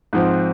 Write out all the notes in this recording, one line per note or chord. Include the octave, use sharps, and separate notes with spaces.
G#2 F3 C4